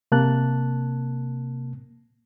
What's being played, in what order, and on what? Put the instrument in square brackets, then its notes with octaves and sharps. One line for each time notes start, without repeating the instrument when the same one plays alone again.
[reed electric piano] C3 A#3 A5 F#6